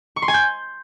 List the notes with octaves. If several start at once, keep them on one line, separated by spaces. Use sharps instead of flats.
C#6
C6
G#5
G6